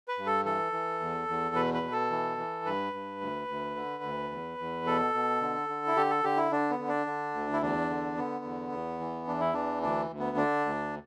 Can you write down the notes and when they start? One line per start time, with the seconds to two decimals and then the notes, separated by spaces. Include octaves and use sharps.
0.08 B4
0.18 G2
0.27 A4
0.45 E3 A4
0.73 E3
1.00 E2
1.28 E2
1.55 B2 B4
1.74 B4
1.83 B2
1.92 A4
2.10 E3
2.38 E3
2.65 G2 B4
2.93 G2
3.21 D2
3.48 D2
3.76 D3
4.03 D2
4.31 E2
4.58 E2
4.86 B2 A4
5.14 B2
5.41 D3
5.69 D3
5.87 E4
5.96 D3 G4
6.10 A4
6.24 D3 G4
6.37 E4
6.52 D3 D4
6.70 B3
6.79 D3
6.88 D4
7.07 D3
7.34 D2
7.53 E4
7.62 E2 D4
7.90 D3
8.17 D3 B3
8.44 E2
8.72 E2
9.00 E3
9.27 E2 D4
9.40 E4
9.54 E3 D4
9.82 D2 D4
10.10 D2
10.19 B3
10.37 D3 D4
10.65 D2